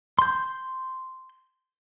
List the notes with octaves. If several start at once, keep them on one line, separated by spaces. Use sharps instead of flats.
C6 G6